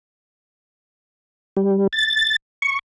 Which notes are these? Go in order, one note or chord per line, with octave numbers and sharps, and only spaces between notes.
G3
A6
C#6